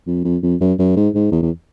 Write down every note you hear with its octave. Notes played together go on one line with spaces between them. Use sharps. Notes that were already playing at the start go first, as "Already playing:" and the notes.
F2
F2
F2
F#2
F#2
G#2
G#2
E2
E2